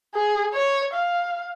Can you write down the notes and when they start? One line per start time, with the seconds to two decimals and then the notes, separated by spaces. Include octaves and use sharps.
0.15 G#4
0.54 C#5
0.93 F5